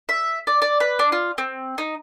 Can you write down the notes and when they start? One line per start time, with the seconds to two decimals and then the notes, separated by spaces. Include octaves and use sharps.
0.09 E5
0.47 D5
0.62 D5
0.80 B4
0.99 D4
1.12 F4
1.38 C4
1.78 D#4